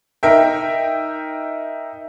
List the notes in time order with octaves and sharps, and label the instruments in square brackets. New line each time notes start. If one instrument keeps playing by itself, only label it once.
[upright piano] D#4 A#4 E5 G5